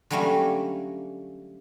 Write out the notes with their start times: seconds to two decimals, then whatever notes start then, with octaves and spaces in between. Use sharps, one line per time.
0.10 D3 F#3 G3 A3 A#3 C#4